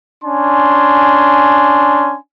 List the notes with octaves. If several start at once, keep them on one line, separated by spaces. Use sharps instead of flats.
C#4 D4 G#5 C6